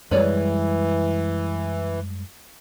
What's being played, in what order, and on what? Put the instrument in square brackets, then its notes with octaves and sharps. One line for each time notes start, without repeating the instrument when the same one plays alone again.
[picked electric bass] F#2 G3 G#3 [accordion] E3 [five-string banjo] B4 C#5 D5